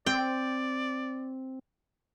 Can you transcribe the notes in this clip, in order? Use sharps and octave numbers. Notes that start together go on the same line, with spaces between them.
C4 D5 G5